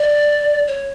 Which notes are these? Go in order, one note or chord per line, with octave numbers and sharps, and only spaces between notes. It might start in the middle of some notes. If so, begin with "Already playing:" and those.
Already playing: D5
C#5